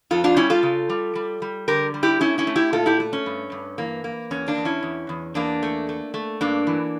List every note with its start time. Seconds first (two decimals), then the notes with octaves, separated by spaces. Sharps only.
0.11 F2 F4 A4
0.24 D4 F4
0.37 G3 C#4 E4
0.50 F4 A4
0.63 C#3
0.90 G3
1.15 G3
1.42 G3
1.68 D3 G4 A#4
1.94 G3
2.03 E4 G4
2.21 A3 C#4 E4
2.38 C#4 E4
2.47 A3
2.56 E4 G4
2.73 A#2 F4 A4
2.86 E4 G4
3.00 A3
3.13 C#4
3.26 G2
3.52 G2
3.78 E3 A#3
4.04 A#3
4.31 E2 C#4
4.48 A#3 D4
4.57 E2
4.65 C#4 E4
4.83 E2
5.09 E2
5.35 E2 A#3 D4
5.63 A3
5.89 A3
6.14 A3
6.41 G2 A#3 D4
6.67 E3